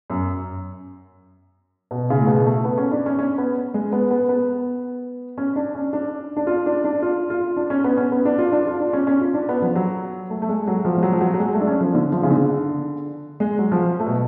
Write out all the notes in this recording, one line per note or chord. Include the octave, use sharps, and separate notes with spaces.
F#2
B2
C#3
A2
B2
A3
B3
C#4
D4
C#4
C#4
B3
G#3
B3
B3
B3
C#4
D4
C#4
D4
D4
F4
D4
D4
F4
F4
D4
C#4
B3
C#4
B3
D4
F4
D4
F4
D4
C#4
C#4
F4
D4
B3
F3
F#3
A3
A3
G#3
F#3
F3
G#3
F#3
F3
F#3
F#3
G#3
A3
D4
C#4
F3
D3
F3
C#3
D3
G#3
F#3
F3
A3
B2